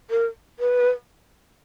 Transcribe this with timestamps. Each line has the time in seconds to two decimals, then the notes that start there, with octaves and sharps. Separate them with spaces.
0.10 A#4
0.59 B4